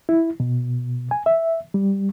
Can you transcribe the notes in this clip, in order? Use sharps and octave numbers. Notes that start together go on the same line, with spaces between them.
E4
B2
G#5
E5
G3